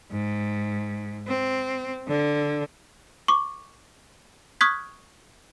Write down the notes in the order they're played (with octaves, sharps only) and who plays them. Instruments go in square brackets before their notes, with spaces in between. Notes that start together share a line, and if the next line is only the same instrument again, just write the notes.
[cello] G#2
C4
D3
[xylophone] C#6 D6
C#6 D#6 F6 F#6 G#6 B6